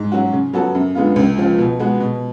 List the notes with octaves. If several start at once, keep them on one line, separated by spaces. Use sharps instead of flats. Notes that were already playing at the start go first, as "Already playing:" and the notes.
Already playing: G#2
F#3 C#4 F#4
C#3
F#3 B3 F#4 A4
F#2
D3 G#3 B3 F4
C#2
C#3 F3
B2
G#3 B3 F#4
B2